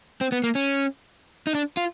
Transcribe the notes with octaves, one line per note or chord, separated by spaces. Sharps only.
C4
B3
A#3
C#4
D#4
D4
F4